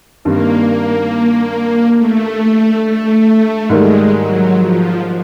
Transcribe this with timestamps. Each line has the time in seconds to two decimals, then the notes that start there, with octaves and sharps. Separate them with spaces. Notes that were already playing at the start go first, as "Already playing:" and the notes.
0.25 G2 D#3 G3 A#3 C4
0.68 A#3
1.98 A3
2.84 A3
3.70 G#2 D#3 G3 G#3 A#3
4.14 F#3
4.56 F3